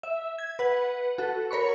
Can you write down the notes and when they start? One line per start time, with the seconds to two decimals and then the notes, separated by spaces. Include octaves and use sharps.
0.03 E5
0.39 G#6
0.59 B4 F#5
1.18 F#4 A4
1.51 A#4 C#5 B5 C#6